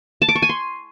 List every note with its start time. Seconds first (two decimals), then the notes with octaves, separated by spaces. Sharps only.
0.22 A5
0.29 D6
0.35 C#6
0.42 G#5
0.49 C6